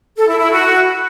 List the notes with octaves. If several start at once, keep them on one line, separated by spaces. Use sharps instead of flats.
A4
E4
E4
F#4